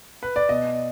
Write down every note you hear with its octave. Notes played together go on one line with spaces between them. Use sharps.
B4
D5
B2 D#5